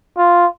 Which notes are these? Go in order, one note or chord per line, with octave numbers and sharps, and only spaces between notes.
F4